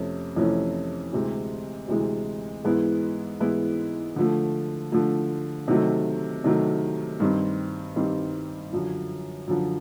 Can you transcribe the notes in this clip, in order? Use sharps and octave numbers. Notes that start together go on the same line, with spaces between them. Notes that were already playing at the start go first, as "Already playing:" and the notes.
Already playing: F2 C3 A3 C#4
F2 C3 E3 A3 C#4
D2 C3 E3 G#3
D2 C3 E3 G#3
G#2 E3 G#3 B3 E4
G#2 E3 G#3 B3 E4
D3 F3 A3
D3 F3 A3
C3 D#3 F#3 A3
C3 D#3 F#3 A3
G2 D#3 G3 C4
G2 D#3 G3 C4
F#2 D3 F3
F#2 D3 F3